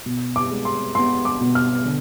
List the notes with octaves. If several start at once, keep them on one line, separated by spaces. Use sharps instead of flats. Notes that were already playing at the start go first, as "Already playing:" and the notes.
B2
D6
G#3
C6
B3 C6
D6
B2
F6
D3